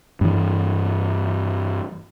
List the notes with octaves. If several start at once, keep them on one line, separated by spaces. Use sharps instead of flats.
G2 E3